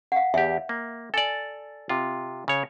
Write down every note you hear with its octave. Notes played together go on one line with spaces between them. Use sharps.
F5 F#5
E2 G4 E5
A#3
A4 D5 G#5
C3 F4
C#3 C#5